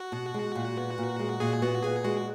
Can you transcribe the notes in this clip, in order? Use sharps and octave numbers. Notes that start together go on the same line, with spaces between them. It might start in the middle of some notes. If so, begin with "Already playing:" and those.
Already playing: F#4
B2
G#3
A#2
B3
A#2
G#3
A#2 G#4
B3 F#4
A#2 G#4
G#3 F#4